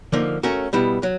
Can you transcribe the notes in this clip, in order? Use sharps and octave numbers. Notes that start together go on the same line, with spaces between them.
D3 F3 A#3 D#4
A3 C#4 F#4 A#4
B2 G3 B3 E4
F#3